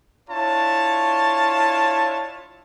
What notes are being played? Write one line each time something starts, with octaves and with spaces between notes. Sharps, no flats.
D4 E4 F4 C#5 A5